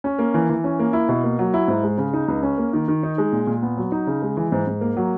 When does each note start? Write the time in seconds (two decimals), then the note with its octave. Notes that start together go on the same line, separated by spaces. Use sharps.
0.04 C#4
0.19 A#3
0.34 E3
0.50 E3
0.64 C#4
0.79 A#3
0.93 E4
1.09 B2
1.24 A#3
1.39 F#3
1.54 E4
1.68 G#2
1.83 G#3
1.98 C#3
2.13 D#4
2.28 C#2
2.43 C#4
2.58 A#3
2.73 D#3
2.88 D#3
3.03 D#4
3.18 G#3
3.32 A#2
3.47 A#2
3.62 B3
3.77 F#3
3.92 D#4
4.07 C#3
4.22 G#3
4.37 E3
4.52 G#2
4.67 G#2
4.81 A#3
4.97 F#3